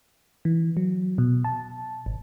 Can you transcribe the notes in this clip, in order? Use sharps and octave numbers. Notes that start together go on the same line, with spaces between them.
E3
F#3
B2
A5
G#1